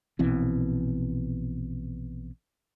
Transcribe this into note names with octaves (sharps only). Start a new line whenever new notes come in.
A#1 B2 E3 C4